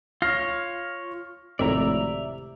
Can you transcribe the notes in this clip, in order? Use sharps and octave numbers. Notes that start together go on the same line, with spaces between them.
F4 C#5 F6 A#6 C7
G#1 F2 A2 C3 D5 E5 A#5